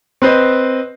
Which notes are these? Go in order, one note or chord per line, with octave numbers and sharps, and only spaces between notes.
C4 B4 C5 D#5